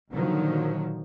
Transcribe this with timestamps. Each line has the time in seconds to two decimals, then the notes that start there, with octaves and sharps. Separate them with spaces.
0.12 A#2 D3 D#3 F3 F#3